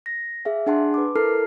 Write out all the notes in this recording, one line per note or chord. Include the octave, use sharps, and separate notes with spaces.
A#6
G#4 E5 F5
D4 G#4 F#5 A5 C6
B4 D6
E4 A4 A#4 A5 F6 C7